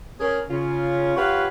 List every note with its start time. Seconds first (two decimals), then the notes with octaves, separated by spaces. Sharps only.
0.20 C#4 G#4 A#4
0.50 C#3 C#4 F4
1.16 F4 G4 B4 C#5 F5 F#5